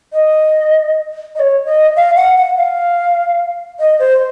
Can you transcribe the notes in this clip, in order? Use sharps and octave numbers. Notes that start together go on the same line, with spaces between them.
D#5
D#5
C#5
D#5
F5
F#5
F#5
F5
D#5
C5